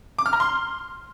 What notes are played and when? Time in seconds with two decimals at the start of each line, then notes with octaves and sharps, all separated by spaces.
0.19 D6
0.26 F6
0.33 A#5
0.40 C6